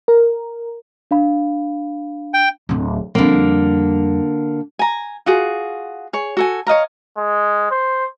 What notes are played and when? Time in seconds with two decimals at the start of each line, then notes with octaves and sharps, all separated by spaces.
0.08 A#4
1.11 D4 F5 B5
2.34 G5
2.69 D1 D3
3.15 F2 D3 G3 A#3
4.79 G#5 A#5
5.26 F4 F#4 G#4
6.13 G#4 C#5
6.37 F#4 A4 G#5
6.67 C#5 D#5 F5 A#5
7.17 G#3
7.71 C5